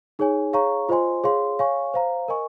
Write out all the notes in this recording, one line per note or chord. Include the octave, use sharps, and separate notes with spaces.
D#4 G#4 C#5 G#5
G#4 C#5 F5 A#5 C#6
F4 C5 D#5 G#5 C6
G#4 C#5 F5 C6
C#5 F5 G#5 C#6
C5 F5 A#5
A#4 D#5 G#5 C#6